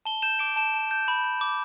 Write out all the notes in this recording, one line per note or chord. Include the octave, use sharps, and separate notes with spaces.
A5 G7
G6 E7
D6 D7
A5 E7
A5
G6
B5
G6
D6